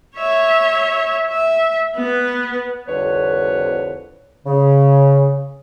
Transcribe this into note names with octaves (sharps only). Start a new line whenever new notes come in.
C#5 E5
E5
B3 B4
C2 F2 D3 B4 C#5
C#3